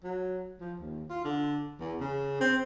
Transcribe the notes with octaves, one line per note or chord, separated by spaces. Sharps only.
F#3
F3
D#2
F4
D3
E2
C#3
C4